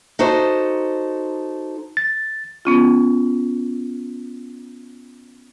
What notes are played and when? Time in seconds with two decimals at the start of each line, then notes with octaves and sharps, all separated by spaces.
0.19 D#4 F#4 A4 C5
1.97 A6
2.65 B3 C#4 F4